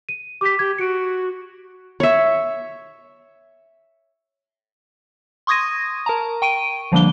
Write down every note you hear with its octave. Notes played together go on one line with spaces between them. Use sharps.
D#7
G4 D6 B6
G4 G#6
F#4 C#7 D7
C#5 E5
C6 C#6 D#6 G#6 A#6 D#7
A#4 A5 A#5
G5 C#6 D7 D#7
D3 F3 G3 A#3 D4 G7